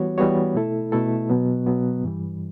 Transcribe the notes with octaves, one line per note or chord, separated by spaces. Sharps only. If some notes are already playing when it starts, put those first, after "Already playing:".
Already playing: E3 G3 B3 F#4 C#5
E3 G3 B3 F#4 C#5
B2 A3 E4 A4
B2 A3 E4 A4
B2 F#3 B3
B2 F#3 B3
G2 E3 G3